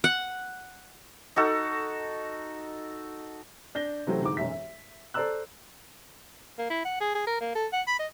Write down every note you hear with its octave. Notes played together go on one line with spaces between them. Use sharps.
F#5
D#4 F#4 A4
D4 G6 A#6 G7
C3 E3 F#3 A3 C4 C#4
D2 G#2 D6
E1 B1 F#2 E5 B6
E5
A4 C5 D5 A#5 E6 F#6
A#3
E4
F#5
G#4
G#4
A#4
A#3
A4
F#5
B5
D#5